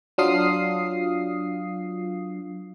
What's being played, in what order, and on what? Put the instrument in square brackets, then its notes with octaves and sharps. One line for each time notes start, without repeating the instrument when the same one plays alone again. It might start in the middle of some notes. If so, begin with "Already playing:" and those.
[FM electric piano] F#3 D4 F4 F5 D#6 C7